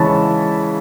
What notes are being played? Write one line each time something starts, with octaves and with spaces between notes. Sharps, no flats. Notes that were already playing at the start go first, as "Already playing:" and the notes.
Already playing: C#3 E3 G#3 C#4 E4 A5 B5 C#6